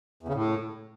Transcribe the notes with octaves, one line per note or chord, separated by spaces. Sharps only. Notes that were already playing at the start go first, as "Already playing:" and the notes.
E2
C#3
A2